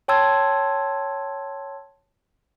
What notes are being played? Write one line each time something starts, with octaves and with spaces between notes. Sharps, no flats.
C#5 G5 A5 C6 E6 G#6